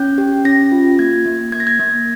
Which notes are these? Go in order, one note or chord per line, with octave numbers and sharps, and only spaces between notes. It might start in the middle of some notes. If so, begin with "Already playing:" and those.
Already playing: C#4 G6
G4
C#4 A#6
F4
A#3 G#6
A#3
A#3 G#6
A#6
G#6
A#3